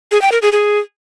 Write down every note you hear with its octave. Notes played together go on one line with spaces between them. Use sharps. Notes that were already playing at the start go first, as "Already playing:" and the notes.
G#4
G5
A#4
G#4
G#4